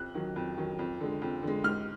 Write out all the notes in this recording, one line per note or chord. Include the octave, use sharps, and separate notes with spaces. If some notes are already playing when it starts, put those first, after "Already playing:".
Already playing: F2 F#6
D#3 F#3
F2
D#3 F#3
F2
D3 G#3
F2
D3 G#3
G#2 F6